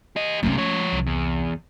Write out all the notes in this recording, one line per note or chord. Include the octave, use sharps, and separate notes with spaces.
G4 D#5
F#2 C3 A3 C#4
F3 C#5
C2
E2